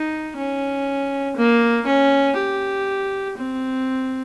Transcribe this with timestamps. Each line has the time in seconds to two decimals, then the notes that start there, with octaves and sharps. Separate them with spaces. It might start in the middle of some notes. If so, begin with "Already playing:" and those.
Already playing: D#4
0.37 C#4
1.36 A#3
1.86 C#4
2.37 G4
3.37 C4